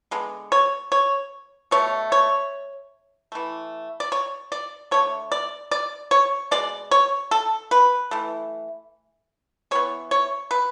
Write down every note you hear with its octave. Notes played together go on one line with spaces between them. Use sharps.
D3 G#3 B3
C#5
C#5
B2 A3 C#5
C#5
E3 A3
D5
C#5
D5
D3 A3 C#5
D5
D5
C#5
B2 G#3 D5
C#5
A4
B4
E3 A3
E3 B3 C#5
C#5
B4